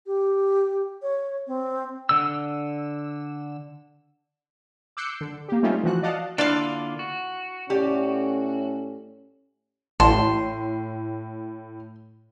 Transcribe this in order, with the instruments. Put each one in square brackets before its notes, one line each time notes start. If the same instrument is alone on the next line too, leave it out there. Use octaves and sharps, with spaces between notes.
[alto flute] G4
C#5
C4
[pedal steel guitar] D3 E6
[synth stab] D6 E6 F#6 G6 C7 C#7
D3
A#3 G4
G3 A3 C4 C#4 D#4 F4
E3 F3 F#4 F#6
D5 D#5 F5 F#5 A5
[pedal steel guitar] D3 A#3 F4 [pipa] D4 E4 F5
[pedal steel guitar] F#4
[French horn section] A2 A3 C#4 [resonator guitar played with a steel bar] G4 D5
[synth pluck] A1 [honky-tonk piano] A2 [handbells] A5 [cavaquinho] C6